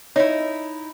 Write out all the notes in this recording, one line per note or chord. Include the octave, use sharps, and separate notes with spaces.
D#4 E4 C#5